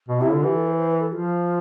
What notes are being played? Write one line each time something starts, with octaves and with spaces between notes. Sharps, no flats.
B2
C3 E4
D3 F4
E3 G4
A4
C5
C5
B4
A4
F3 F4